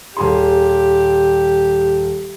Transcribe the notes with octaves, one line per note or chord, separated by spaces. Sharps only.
D#1 G4 G#4 C6